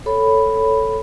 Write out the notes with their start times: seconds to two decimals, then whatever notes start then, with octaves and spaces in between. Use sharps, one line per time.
0.06 A4 C#5 B5